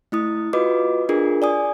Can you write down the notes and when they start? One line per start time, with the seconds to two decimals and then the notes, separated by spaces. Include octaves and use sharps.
0.12 A3 E4 D#6
0.53 F4 F#4 B4 D#5 D6
1.09 D4 F4 G#4 A#4
1.42 D5 G#5 D#6